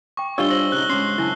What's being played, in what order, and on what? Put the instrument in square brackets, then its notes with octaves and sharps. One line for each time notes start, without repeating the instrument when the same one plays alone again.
[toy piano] G5 D6 [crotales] C#6
[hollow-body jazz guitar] G3 F4 C#5 [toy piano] D4 G4 D#5 [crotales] E6 G7
[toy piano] C5 [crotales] E6 A#6 F#7
[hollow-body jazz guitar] C#3 D#4 [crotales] F#6 G7
[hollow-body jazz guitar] G#2 C#4 [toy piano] C6 D6 [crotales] C7
[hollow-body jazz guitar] F#2 C#3 [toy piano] E4 G#5 A5